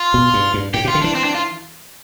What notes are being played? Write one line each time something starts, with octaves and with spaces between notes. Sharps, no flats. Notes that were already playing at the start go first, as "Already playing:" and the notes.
Already playing: F4
B2
G2
G2
A2 G4
B2 F4
D3
E3 D4
C4
D4
F4